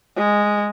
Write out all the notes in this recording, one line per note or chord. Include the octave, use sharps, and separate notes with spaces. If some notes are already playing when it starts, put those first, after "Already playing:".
G#3